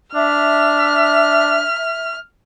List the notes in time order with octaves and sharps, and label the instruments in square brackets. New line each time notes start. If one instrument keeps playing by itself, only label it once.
[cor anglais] D4 [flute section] E5 [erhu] F6